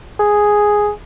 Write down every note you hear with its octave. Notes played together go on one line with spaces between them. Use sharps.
G#4